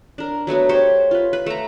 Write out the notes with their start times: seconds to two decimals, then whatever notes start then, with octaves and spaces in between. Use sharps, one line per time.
0.18 D4 A#4
0.47 F#3 A3 B3 F#4
0.69 G4 C5 C#5
1.11 F4 B4
1.33 B4
1.46 A3 A#5